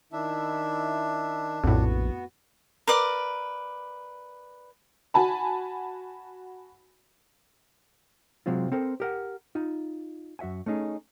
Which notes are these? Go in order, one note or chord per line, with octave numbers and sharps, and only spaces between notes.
D#3 D4 E4 E5
A#1 F2 A2 B3 F#4
A#4 B4 D5 D6
F#4 G#5 A5 B5
C3 F#3 G#3 C4 F4
C4 A4 A#4 C5
G4 A#4 F#5
D#4 F4
F#2 F#4 E5 F#5 G#5
A3 C#4 D#4 G#4